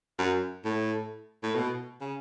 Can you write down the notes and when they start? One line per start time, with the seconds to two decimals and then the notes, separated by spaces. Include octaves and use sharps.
0.19 F#2
0.65 A2
1.43 A2
1.55 B2
2.01 C#3